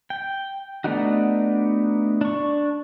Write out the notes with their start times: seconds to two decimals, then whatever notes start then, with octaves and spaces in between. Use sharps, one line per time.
0.10 G5
0.84 A3 B3 D4 D#4 F#4
2.21 D4 C#6